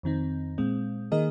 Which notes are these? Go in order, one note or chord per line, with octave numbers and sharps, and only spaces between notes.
F2 D#3 C4 D#4
A#2 G#3 C4
D#3 A#3 G#4 D#5